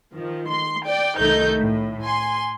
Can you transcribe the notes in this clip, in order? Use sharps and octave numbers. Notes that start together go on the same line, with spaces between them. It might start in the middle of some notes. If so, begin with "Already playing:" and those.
D#3 F3
C6
D5 G5
C2 D#3 A3 D#4 G6
A2
G#5 C6